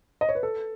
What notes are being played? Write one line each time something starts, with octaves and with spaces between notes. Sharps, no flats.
D#5
C#5
B4
A4